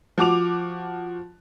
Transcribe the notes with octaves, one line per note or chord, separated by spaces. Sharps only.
F3 F#4 D6 F7